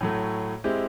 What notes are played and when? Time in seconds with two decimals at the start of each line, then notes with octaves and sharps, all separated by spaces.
0.01 A2 F#3 A3
0.64 G#3 C4 E4 G4